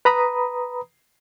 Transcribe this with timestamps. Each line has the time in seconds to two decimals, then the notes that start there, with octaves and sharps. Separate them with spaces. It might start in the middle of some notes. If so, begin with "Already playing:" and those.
0.05 B4 A#5 B5 D#6